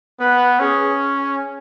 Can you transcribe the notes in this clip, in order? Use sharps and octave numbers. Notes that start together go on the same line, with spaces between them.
B3 B4
C#4 G#4